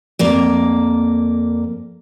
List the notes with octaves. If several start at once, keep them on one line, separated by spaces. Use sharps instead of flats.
F2 A#3 D5